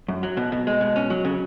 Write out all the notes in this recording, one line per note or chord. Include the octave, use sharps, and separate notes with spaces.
F#2
F#3
B2
B2
G#3
B2
C#4
F#3
C#3